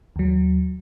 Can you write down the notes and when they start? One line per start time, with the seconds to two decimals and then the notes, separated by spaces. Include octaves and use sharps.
0.16 D#2 F#3